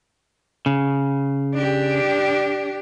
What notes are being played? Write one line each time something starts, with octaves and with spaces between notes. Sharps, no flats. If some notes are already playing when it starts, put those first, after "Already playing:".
C#3
D4 G4